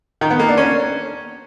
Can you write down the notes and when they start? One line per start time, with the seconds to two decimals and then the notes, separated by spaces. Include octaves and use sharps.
0.21 D#3
0.30 B3
0.39 A#3
0.48 D4
0.57 C#4